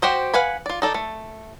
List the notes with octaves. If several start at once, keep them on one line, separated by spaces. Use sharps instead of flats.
F#4 G4 C5 D#5
B4 F5 F#5 G#5 B5
F4 D5
D#4 A4 D5
A3